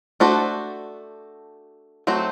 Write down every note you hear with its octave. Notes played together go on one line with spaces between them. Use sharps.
A3 D4 F#4 A4 C5
F#3 A3 C4 F#4